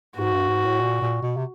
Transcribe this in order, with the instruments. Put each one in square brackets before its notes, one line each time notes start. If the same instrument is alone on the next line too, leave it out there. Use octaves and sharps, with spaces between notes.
[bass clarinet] G#2 [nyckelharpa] F#4
[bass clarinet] G2
G#2
A2
A#2
A#2
B2
C3